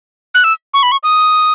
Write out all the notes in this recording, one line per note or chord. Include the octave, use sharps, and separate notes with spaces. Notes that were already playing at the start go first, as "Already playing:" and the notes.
F#6
E6
C#6
B5
C#6
D#6